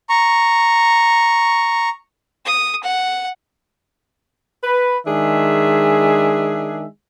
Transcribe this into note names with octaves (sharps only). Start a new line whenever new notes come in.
A#5 C#6
D#6
F#5
B4
D#3 G#3 D4 G#4 E5